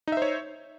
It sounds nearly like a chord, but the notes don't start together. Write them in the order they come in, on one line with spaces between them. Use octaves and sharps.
D#4 E5 C5 C#5